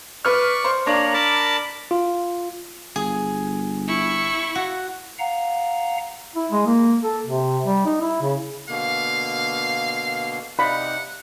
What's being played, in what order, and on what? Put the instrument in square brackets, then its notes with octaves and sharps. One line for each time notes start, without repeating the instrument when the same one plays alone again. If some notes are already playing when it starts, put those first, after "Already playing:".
[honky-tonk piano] B4 F6 [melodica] D5 C#6
[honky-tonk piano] C5
[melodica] A#3 C#5 A#5 [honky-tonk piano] D4 D5
[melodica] A#4 A5 B5
[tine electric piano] F4
[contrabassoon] G1 [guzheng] G#4
[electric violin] E4 C#6
[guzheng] F#4
[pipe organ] F5 F#5 A#5
[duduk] E4
G#3
A#3
A4
C3
G3
D#4
E4
C#3
[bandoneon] B2 D3 A#3 [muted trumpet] F5
[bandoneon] C3 D#4 [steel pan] D5 F5 B5 [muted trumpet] F#5